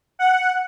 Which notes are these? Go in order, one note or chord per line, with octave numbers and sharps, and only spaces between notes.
F#5